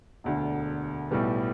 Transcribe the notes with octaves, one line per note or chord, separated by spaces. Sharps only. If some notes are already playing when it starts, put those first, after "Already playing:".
E1 D2 D3
B1 A2 G3 B3